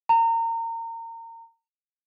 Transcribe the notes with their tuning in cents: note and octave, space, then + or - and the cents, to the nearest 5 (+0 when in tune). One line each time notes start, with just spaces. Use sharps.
A#5 -30